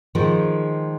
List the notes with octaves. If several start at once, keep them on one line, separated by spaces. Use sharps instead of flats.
D#3 F3 G#3